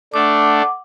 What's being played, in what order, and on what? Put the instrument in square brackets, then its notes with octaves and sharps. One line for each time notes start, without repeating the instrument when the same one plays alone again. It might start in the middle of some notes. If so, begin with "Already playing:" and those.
[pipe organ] A3 D4 [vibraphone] F#5 D6